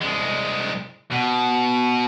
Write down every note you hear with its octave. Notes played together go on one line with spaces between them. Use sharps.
C2 G#3
B2